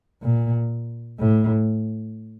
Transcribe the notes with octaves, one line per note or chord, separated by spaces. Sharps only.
A#2
A2